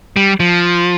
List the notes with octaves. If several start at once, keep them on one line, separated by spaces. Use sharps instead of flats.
G3
F3